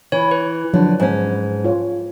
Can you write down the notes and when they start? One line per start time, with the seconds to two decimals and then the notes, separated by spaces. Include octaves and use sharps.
0.12 E3 C#5
0.31 B4
0.74 D3 F3 F#3 C#5
1.00 G#2 C#4
1.65 F4 C#5